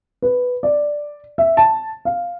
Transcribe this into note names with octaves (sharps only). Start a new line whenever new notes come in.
B4
D5
E5
A5
F5